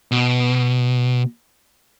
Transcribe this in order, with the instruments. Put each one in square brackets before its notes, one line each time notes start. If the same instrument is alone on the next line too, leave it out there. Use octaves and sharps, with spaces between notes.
[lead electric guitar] B2